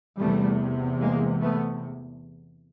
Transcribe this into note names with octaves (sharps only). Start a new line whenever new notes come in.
E2 C3 G3 A3
G#3 A#3
A3 B3